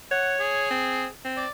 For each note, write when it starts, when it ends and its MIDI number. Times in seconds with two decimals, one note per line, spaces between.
0.11 0.67 73
0.11 0.35 78
0.40 1.07 68
0.70 1.07 60
1.24 1.46 60
1.37 1.51 74